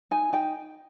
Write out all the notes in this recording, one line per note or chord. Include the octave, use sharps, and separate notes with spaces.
D#4 G#5
D#4 G5